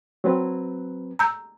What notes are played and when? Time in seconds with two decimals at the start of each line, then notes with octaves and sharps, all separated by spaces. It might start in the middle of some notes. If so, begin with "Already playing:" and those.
0.24 F#3 C4 B4
1.19 A#5 E6 G6